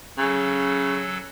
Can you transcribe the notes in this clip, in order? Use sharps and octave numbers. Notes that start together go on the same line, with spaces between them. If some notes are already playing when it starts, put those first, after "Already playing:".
C#3 F#3 A4